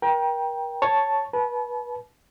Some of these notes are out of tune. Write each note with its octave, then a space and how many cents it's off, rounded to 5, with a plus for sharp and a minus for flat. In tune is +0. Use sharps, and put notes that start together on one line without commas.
A#4 +35 G5 +5
C#5 +0 A5 +0
B4 -25 A5 -40